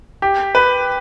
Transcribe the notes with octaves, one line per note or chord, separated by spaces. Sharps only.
G4
B4